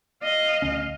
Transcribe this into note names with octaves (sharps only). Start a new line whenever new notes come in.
D#5 F5
D1 D2 C#4